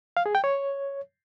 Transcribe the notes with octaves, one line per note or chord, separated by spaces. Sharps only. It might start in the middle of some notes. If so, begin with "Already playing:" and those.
F5
G#4
G5
C#5